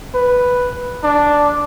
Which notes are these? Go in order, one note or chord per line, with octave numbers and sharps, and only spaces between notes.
B4
D4